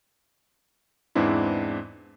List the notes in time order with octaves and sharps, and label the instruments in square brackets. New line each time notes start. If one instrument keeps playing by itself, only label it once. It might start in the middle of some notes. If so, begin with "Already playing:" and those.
[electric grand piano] E2 G#2 E3 C4 D4 E4